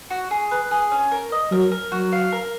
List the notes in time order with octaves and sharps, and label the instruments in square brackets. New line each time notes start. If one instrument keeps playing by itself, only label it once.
[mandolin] F#4
G#4
B4
G#4
C#4
A#4
D#5
[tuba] F#3 [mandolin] A#4
[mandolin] A#4
[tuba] F#3 [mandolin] F#4
[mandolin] F5
A#4